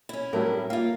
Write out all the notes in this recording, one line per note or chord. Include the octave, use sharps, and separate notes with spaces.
C#4 E4
A2 F#3 G3 A#4
G3
A#3 F4 F5